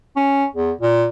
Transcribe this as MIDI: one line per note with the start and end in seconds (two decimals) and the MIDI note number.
0.16 0.45 61
0.55 0.72 40
0.81 1.07 46